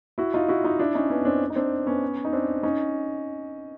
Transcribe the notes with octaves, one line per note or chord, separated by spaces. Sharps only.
E4 F#4
D#4 F4
E4 F#4
D#4 F4
D4 E4
C#4 D#4
B3 C#4
C4 D4
D#4
C4 D4
B3 C#4
D#4
C4 D4
C#4 D#4